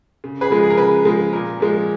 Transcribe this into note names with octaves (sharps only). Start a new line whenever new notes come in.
C#3
G#4 B4
F3 G#3
G#4
A#4
C#3 G#4 B4
F3 G#3
A#2 A#4
F3 G#3